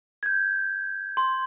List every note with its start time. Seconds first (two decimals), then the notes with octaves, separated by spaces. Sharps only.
0.23 G6 G#6
1.17 C6